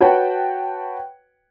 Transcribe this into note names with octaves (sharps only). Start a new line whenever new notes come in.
F#4 B4 C#5 F#5 G5 A5